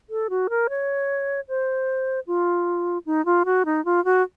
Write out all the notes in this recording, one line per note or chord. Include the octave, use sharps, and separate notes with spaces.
A4
F#4
A#4
C#5
C5
F4
D#4
F4
F#4
D#4
F4
F#4